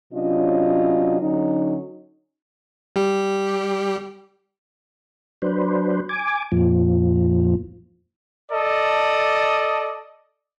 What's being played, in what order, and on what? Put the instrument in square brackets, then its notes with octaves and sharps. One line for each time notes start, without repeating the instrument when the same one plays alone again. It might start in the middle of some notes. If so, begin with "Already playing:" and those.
[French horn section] C3 F#3 C#4 D4 F4 D#5
D3 F#3 C#4 D#4
[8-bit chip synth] G3 G4
[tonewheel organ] F#3 D4 B4 C5
G#5 D6
F2 A#2 F3
[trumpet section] A4 D5 D#5